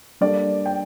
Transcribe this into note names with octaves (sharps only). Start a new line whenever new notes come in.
G3 A#3 D4 A4 D5
G5